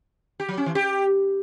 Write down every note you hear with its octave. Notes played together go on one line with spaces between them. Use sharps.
G4
F#3
C#4
E3
G4